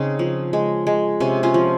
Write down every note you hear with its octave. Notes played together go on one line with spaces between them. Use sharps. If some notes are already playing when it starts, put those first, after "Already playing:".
Already playing: C#3 C4 D#4
F3
G#3
G#3
C3 C#4
C#4 F4
F3